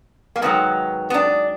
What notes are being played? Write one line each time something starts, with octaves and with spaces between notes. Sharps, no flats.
A#3
G#2 D#3 F#3 B3
B3
D4